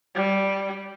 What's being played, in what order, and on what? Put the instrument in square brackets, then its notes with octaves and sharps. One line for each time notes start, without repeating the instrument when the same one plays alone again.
[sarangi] G3